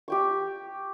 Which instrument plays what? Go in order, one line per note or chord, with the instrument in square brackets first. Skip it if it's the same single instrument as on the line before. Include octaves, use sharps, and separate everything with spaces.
[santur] G4 G5 C#6